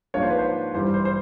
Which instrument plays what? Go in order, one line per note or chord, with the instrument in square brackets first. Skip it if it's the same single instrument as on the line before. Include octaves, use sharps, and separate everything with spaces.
[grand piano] G#2 F3 A#3 D4 F4 C#5
C5
B4
C5
G2 E3 G3 C5
C5
C5